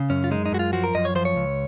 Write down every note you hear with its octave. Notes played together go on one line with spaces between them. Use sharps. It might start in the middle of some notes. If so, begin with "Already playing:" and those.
Already playing: C#3
F#2 C#4
F4
G#3 D#4
D#4
F#2 F#4
F4
F3 F#4
A#4
F#2 D#5
C#5
F3 C5
C#5
C#2